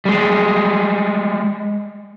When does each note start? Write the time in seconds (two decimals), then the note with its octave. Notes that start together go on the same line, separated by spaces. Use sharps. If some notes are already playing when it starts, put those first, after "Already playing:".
0.05 G3 G#3